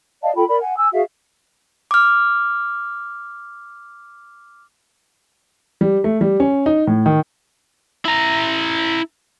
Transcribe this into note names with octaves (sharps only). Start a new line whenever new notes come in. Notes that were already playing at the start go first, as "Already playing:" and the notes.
D5 D#5 F5 A5
F4 A4 G5 B5
A#4 D5 B5
F#5 G#5
G#5 E6
F#4 G#4 E5 F5
D6 F6
G3
A3
G3
C#4
D#4
A2
D#3
E4 A#5